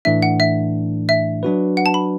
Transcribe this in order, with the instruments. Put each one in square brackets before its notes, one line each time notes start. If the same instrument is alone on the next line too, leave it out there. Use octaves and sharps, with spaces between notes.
[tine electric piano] A2 E3 A3 D4 [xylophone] E5
[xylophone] F#5
E5
E5
[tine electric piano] F#3 D4 F#4 B4
[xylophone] F#5
A5
B5